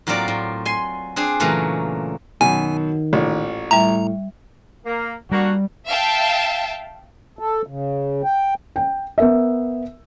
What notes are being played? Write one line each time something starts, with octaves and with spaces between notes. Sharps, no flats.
A2 F#3 A#3 C4 F4 D5
A2
G#5 C6
C4 D4 G#4
A#2 C#3 E3 F#3 A3 A#3
F#2 B2 D#3 G#5
A1 A#2
A2 G3 E5 A#5
A#3
G3 A#3 D4 F#4
E5 F5 G5 A5
A4
C#3
G5
G5
B3 A#4 E5